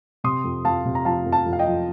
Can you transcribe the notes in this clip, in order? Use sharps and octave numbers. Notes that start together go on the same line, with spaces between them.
C3 C6 D#6
F2
F2 F5 A5
C3
A#5
F3 F5 A5
F2
F5 A5
F2
F5
D#5 G5
F3